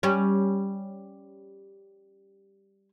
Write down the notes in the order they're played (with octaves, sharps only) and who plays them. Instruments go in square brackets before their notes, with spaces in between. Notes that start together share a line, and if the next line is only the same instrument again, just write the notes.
[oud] G3 C#4